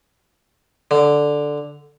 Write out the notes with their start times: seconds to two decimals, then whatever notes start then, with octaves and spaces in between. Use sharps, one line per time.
0.91 D3